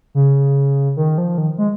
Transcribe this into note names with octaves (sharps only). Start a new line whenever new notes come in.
C#3
D#3
F3
D#3
G#3